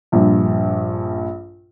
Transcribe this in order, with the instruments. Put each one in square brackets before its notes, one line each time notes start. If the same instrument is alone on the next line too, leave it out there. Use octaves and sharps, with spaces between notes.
[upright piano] A#1 G2